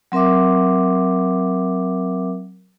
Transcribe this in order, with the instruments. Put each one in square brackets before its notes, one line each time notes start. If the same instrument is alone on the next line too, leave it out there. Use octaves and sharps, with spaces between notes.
[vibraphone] F#3 C4 A#4 E5 D6